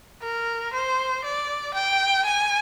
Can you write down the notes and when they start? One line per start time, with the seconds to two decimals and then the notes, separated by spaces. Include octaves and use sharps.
0.22 A#4
0.73 C5
1.24 D5
1.74 G5
2.25 G#5